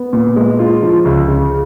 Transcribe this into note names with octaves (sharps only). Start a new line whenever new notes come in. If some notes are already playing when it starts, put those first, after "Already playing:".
Already playing: B3
A#2
G#3
F4
F3
C#2
C#3